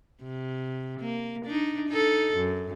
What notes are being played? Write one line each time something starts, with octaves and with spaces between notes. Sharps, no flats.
C3
A#3
D4 D#4
D#4 A4
F#2